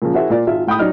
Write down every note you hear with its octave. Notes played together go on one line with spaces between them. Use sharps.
A#2 C#3 F3
E4 F#4 G#4 A#4 C5 E5
A#2 F4 D5
G#1 F4 E5
A2 G5 B5 D#6
F#3 D#4 D5 F6